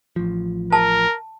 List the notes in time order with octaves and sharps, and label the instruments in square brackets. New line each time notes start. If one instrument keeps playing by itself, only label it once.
[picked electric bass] A1 F3
[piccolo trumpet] A#4 [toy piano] A5